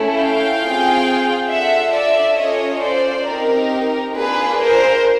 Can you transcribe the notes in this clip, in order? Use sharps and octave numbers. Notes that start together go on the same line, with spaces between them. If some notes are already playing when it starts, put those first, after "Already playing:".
Already playing: A3 C#4 E4
F5 G5
C4 F4 G#4
D4 F4 A4 E5 F#5
D5 E5
C#4 F4 A4 C#5 D#5
C5 D5
C4 D#4 G4 A#4
A#3 D4 F4 G#4 B4
A#4 C5